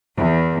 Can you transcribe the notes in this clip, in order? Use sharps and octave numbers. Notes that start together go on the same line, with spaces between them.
E2